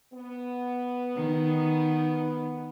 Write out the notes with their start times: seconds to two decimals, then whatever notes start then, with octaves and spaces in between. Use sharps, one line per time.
0.13 B3
1.16 D#3